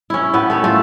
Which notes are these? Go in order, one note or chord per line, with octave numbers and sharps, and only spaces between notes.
C#4 E4
A2 B3 B4
A3 B4 C#5
A3 F4